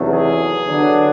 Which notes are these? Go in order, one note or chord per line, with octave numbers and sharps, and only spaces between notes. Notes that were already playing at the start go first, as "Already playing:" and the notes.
Already playing: E2 C3 D#3 F#3 A3
G#4
D3 F#3 B3 D4